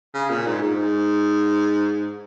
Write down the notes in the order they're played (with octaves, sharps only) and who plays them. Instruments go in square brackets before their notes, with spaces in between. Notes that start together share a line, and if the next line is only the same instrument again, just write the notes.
[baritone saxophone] C#3
A#2
G#2
G#2